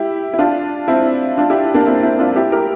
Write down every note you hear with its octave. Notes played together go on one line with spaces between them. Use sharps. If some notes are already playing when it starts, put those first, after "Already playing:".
Already playing: E4 G4
E4
D4 F4
C4 E4
D4 F4
E4 G4
A#3 D4
C4 E4
C4 E4
D4 F4
E4 G4
G4 A#4